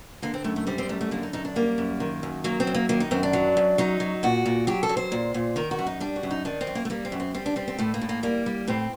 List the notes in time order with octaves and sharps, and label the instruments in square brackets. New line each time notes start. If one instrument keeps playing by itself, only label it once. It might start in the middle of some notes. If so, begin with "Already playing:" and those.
[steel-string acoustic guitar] D3 A#3
C4
F#2 A3
A3
G3 C4
C4
F#2 A3
A3
D3 A#3
D#4
F#2 D#4
D4
G3 A#3
F#2
D#3
F#2
F#3 A#3
C4
F#2
A#3
D#3 A#3
D#4
F#2 C4
D4
F#3
F#2
F#3 D#4
F#3
A#2 F#4
A#2
F#3 G4
A4
F#3
C5
A#2
A#2
D#3 A#4
F#4
F#2
D#4
G3 D4
F#4
F#2
D#4
D#3 D4
C4
F#2
A#3
A3
G3 A#3
C4
F#2
C4
G3 C4
D4
G3 C4
C4
A2 A3
A#3
A2
A#3
G3 A#3
G3
A2 C4